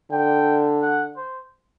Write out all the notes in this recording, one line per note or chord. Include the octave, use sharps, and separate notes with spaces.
D3 G5
F#5
C5